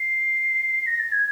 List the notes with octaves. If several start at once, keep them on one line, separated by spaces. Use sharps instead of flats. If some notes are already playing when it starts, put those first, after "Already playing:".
Already playing: C7
A#6
A6
G#6